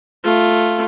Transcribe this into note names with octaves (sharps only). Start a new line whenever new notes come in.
A3 F4